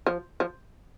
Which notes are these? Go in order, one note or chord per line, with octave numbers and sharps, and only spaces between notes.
F3
F3